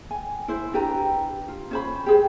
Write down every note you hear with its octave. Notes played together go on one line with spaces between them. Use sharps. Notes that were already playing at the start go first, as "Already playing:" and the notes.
G#5
E4 C5
D4 G4 B4 A#5
F4
C#4 C5 B5
G4 G#4 C5